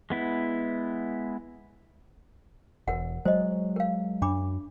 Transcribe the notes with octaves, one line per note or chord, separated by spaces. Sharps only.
G#3 B3 E4
E1 A#4 F#5
F#3 G#3 C5 D#5
A#4 F5
F#2 D4 B5 D6